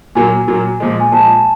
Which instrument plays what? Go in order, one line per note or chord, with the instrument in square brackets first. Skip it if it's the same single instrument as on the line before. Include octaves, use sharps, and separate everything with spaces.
[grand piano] A#2 F#3 A#3 [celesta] G#5
[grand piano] A#2 F#3 A#3
A#2 F3 G#3
[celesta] G#5
[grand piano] A#2 F3 G#3 [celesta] A5